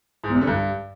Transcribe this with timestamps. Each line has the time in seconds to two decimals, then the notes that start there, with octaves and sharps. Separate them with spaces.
0.24 G#2
0.29 E2
0.35 C3
0.41 D3
0.47 G2